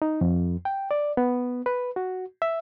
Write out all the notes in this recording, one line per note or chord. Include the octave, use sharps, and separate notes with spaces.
D#4
F2
G5
D5
B3
B4
F#4
E5